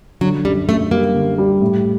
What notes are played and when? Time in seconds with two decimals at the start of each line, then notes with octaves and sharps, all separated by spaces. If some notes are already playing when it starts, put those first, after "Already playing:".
0.21 D3 F#3
0.45 F#2 G3
0.68 F#2 A3
0.91 G3 A#3
1.14 D3
1.38 G3
1.62 A2